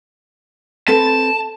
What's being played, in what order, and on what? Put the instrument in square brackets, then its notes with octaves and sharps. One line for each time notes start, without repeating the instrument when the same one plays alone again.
[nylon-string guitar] C4 A4 B4 [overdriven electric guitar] A5